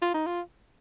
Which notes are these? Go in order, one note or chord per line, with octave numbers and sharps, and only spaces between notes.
F4
D#4
F4